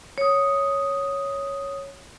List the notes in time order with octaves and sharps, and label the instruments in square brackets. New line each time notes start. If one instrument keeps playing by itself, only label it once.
[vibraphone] C#5 D#6